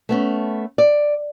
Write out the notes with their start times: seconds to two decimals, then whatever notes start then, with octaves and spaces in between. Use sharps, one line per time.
0.09 A3 B3 C#4
0.78 D5